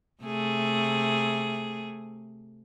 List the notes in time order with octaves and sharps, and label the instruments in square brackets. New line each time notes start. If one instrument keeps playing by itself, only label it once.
[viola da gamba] C3 A3 G#4